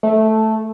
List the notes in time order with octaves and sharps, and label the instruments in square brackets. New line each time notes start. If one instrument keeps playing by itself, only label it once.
[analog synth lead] A3